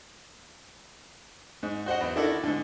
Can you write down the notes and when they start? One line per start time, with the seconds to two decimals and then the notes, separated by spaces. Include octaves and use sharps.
1.63 G#2
1.86 F#4 C5 D#5 F#5
2.01 E2
2.16 D#3 D4 E4 F#4 A4
2.44 G#2 D3